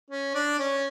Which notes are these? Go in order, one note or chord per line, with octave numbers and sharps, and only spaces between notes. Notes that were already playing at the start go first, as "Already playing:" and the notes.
C#4
D4
C#4